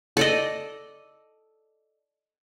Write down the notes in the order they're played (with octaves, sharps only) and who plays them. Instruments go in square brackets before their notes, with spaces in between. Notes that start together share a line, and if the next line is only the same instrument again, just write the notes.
[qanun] A4 D5 D#5